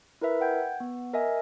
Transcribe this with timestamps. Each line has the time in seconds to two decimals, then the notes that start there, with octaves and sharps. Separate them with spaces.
0.21 E4 A#4 B4 E5
0.41 F#5 G5 G6 G#6
0.80 B3
1.13 A#4 D#5 E5 G#5